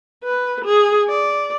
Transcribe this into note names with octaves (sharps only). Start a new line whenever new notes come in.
B4
G#4
D5